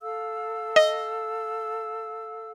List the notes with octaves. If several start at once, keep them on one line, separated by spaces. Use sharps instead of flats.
A4 F5 E6
D#5